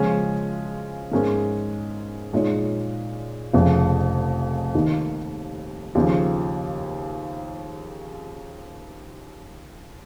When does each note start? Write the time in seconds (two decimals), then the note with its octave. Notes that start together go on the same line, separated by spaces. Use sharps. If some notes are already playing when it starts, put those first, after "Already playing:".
Already playing: C#3 F3 G#3 C#4 F4
1.12 G#2 G#3 C#4 A#4
2.33 A#2 G#3 D#4 C#5
3.53 F1 F2 C#3
4.75 D#2 D#3 A#3 D#4
5.95 D#2 C#3 F3